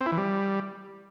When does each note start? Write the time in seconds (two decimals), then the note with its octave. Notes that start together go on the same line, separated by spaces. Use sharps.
0.01 C4
0.06 E4
0.12 E3
0.18 G3